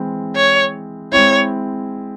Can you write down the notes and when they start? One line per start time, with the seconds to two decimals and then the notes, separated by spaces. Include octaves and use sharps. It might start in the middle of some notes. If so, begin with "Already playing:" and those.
Already playing: E3 G#3 C4 E4
0.36 C#5
1.12 G#3 C4 E4 C#5